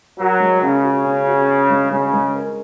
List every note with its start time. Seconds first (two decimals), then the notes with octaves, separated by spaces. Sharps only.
0.19 F#3 A#4
0.40 G#3
0.62 C#3 C#4
0.84 F#4
1.05 C#4
1.27 F#4
1.48 C#4
1.70 G#3
1.91 C#3 G#3
2.13 G#3
2.35 A#4